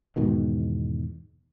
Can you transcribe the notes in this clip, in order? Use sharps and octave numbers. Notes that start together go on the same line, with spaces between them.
E2 G#2 B2 D#3